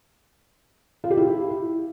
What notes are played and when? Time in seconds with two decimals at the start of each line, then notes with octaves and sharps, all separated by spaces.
1.04 F4
1.10 G4
1.17 E4